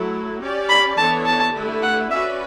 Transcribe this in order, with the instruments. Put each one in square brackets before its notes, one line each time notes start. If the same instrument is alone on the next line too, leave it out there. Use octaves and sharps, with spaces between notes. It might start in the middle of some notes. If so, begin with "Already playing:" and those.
Already playing: [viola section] F#3 A3 E4
C#4 G4 D5
[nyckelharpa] B5
[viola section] E3 B3 D4 A4 C#5 [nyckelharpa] A5
[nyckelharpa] A5
[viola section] D3 A3 E4 G4 B4
[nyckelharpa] F#5
[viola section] C#4 F#4 B4 D5 [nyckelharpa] E5